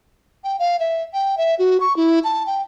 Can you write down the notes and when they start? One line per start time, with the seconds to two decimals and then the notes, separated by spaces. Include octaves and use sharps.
0.44 G5
0.59 F5
0.80 E5
1.13 G5
1.38 E5
1.59 F#4
1.80 C#6
1.97 E4
2.24 A5
2.47 G5